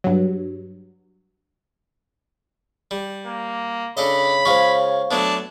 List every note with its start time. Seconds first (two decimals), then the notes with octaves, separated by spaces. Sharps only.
0.04 G2 F#3
2.91 G3
3.26 A#3
3.97 C#3 D4 A4 D#5 B5
4.45 G#3 C#4 F4 C5 F5 C#6
5.11 F#3 A3 B3 D4